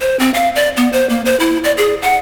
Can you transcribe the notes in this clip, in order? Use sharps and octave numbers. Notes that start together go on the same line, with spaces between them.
C5
C4
F5
D5
B3
C5
A#3
C5
E4
D5
G#4
F#5